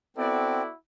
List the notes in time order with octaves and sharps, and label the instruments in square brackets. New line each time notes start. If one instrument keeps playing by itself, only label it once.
[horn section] B3 A4 D5 [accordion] C4 [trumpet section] E4 F#4 F#5